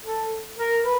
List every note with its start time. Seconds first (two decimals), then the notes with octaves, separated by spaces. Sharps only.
0.05 A4
0.58 A#4
0.84 B4